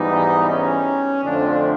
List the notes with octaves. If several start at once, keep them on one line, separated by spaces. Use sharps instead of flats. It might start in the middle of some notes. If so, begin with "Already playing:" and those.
Already playing: G#2 E3 G3 B3 D#4
C#4
F2 D3 F3 A3 C4 D4